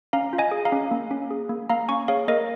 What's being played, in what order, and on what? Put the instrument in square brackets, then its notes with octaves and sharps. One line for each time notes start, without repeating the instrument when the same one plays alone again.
[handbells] C#4 F5 A#5
F4
D#5 G#5
G#4
F5 A#5
C#4
A#3
C#4
G#4
A#3
A#3 F5 A#5
C#4 G#5 C#6
G#4 C#5 F5
A#3 A#4 D#5